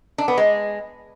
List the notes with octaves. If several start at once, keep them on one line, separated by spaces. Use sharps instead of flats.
D4
B3
G#3